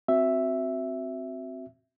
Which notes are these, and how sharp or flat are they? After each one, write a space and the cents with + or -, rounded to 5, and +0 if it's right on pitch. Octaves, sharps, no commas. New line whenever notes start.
C4 +0 F#4 -5 E5 +0